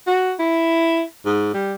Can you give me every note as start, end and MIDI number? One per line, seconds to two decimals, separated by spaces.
0.07 0.32 66
0.39 1.03 64
1.25 1.53 44
1.54 1.75 55